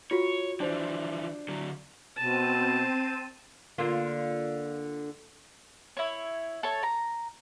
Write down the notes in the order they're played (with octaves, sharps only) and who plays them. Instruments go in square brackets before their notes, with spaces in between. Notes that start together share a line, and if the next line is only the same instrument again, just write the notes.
[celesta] F4 F#4 [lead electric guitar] C#5
[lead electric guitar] E3 F3 [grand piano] D4 C5
[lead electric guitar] D3 F#3
[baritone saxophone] B2 [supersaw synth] C4 D#7 [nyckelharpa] A5
[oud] D3 A#3 F4
[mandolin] E4 C#5
A4 C#5
A#5